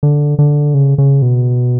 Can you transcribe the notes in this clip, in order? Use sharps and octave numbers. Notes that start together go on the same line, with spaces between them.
D3
D3
C#3
C#3
B2